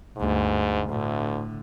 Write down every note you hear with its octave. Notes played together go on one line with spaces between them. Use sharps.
G1 D2 G#2
D2 A2 D3